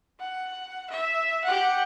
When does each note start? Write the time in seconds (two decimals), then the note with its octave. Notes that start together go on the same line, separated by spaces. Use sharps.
0.20 F#5
0.90 E5
1.44 G4 F#5